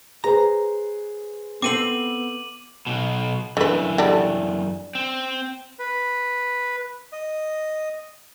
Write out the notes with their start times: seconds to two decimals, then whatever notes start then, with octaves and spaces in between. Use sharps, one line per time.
0.24 G#4 B4 C5 A#5
1.62 B3 C4 A4 C5 D6 D#7 F#7
2.87 B1 B2
3.57 F#2 D3 E3 B4
3.98 D3 G3 D4
4.95 C4
5.79 B4
7.13 D#5